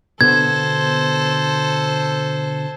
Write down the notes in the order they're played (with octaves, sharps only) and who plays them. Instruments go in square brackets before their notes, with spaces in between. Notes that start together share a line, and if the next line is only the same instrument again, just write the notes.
[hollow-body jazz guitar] B2 D3 B3 [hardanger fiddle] A4 C5 [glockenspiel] G#6